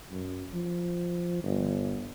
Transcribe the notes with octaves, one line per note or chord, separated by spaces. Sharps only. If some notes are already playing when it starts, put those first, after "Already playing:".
F#2
F3
G1